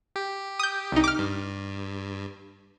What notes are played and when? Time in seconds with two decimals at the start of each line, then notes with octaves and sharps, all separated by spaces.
0.16 G4
0.59 D#6 G6
0.92 C2 D#4
1.04 D6 F6
1.19 G2